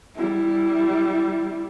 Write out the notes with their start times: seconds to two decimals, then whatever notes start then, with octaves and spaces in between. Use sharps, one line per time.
0.16 G3 E4